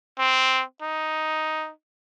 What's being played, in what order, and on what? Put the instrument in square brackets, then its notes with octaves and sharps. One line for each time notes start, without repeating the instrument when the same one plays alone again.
[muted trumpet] C4
D#4